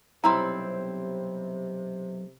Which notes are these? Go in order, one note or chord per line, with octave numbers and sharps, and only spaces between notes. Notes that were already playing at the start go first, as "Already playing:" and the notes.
B1 C3 G3 C4 E4 A#5 C6